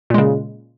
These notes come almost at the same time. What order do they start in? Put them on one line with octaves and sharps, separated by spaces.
A#2 G#3 C#3